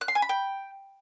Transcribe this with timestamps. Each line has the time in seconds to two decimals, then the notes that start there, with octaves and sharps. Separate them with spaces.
0.01 F#6
0.08 C6
0.15 G#5
0.22 B5
0.29 G5